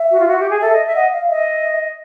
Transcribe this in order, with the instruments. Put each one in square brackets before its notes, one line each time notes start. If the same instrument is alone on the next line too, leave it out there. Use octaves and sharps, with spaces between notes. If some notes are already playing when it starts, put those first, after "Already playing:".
Already playing: [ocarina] E5
[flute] F#4
F4
F#4
G4
G#4
[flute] A4 [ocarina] E5
[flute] D#5
E5
[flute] D#5 [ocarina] F#5
[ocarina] F5
[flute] D#5 [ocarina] E5